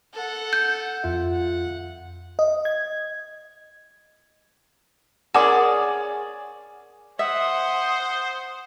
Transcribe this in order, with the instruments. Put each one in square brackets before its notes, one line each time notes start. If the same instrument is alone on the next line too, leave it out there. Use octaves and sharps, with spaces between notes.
[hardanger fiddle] A4 F#5
[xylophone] G6
[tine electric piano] F2 F4 E5
[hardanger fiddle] F#5
[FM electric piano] D#5
G#6
[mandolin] C#4 D5 [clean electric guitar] G#4 [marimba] A#4 C6 [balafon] F#5
[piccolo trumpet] C5 [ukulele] E5 [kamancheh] F#5 [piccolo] D#6